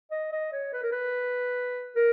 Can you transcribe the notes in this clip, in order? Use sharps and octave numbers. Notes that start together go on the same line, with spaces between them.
D#5
D#5
C#5
B4
A#4
B4
A#4